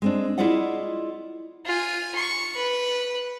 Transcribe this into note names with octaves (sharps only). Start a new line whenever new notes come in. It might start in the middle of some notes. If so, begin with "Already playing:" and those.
G#3 C4 D4
E4 F4 G#4 D5 D#5 F#5
F4 G#5
C#6
B4